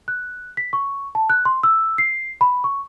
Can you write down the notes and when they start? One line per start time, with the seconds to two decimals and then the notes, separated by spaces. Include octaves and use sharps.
0.08 F#6
0.57 B6
0.73 C#6
1.15 A5
1.30 F#6
1.45 C6
1.63 E6
1.98 C7
2.41 B5
2.64 C#6